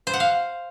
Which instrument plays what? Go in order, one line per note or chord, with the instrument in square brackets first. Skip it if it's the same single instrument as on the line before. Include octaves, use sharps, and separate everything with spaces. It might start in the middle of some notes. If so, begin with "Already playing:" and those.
[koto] C5
F#5
F5